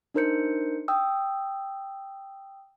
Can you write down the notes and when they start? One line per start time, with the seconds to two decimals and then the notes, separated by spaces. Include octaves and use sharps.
0.14 D4 D#4 A#4 C5 G6 C#7
0.88 G5 D#6 E6